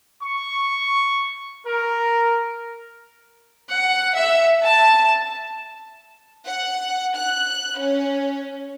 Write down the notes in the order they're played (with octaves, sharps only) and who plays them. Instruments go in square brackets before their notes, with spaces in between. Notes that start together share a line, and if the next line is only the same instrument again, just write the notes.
[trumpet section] C#6
A#4
[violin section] F#5
E5
A5
F#5
F#6
C#4